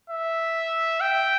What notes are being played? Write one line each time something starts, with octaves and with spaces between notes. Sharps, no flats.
E5
G5